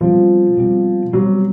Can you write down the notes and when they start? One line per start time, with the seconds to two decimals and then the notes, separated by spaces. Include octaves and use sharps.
0.01 B2 F3 G3 C4
0.57 B2 G3 C4
1.13 B2 F#3 G3 C4